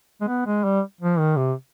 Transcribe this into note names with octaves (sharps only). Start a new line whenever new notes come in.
G#3
B3
G#3
G3
F3
D#3
C3